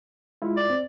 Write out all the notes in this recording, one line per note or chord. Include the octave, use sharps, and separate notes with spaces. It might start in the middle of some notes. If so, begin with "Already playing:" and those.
G#3 E4 F4
D5
C4